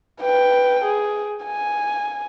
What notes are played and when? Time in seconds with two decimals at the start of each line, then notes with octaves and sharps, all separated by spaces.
0.22 B4 G5
0.85 G#4
1.45 G#5